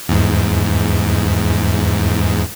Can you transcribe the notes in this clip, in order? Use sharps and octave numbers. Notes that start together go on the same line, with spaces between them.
E2 G#2